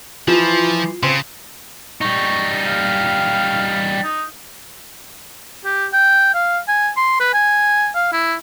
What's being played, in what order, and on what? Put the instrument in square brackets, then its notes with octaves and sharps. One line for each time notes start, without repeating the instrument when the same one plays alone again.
[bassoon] E3 [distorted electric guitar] F3 [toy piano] F4
[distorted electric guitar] C#3 [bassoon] C4 [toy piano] C6
[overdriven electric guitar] G3 D#4 [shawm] C#6
[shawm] F5
D#4
G4
G5
F5
G#5
C6
B4
G#5
F5
E4